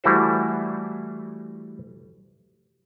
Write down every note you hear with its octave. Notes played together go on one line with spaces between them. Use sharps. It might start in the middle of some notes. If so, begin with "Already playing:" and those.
E3 G3 A3 E4 F#4 C5